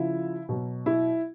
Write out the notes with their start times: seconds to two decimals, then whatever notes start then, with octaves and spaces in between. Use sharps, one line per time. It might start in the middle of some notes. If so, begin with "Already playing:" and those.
Already playing: C#3 F3 E4
0.49 B2 F#3
0.86 E4